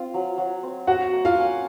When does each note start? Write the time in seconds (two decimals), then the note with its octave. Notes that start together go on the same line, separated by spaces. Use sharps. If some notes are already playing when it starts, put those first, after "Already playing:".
Already playing: C4 F4
0.14 F#3
0.38 F#3
0.63 C4
0.87 F#3 F#4 F#5
1.13 A#3
1.25 F4 F5
1.38 C#4